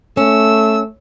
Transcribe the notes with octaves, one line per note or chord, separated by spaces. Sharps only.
A3 C#4 E6